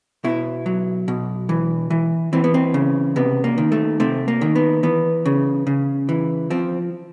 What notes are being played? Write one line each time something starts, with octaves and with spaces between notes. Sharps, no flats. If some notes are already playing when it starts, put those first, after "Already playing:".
B2 E4
F#3
B2
E3
E3
E3 C4
B3
C4
C#3
C3 B3
A#3
D#3
A3
C3 A3
A#3
D#3
B3
E3 B3
C#3
C#3
E3
F3 C4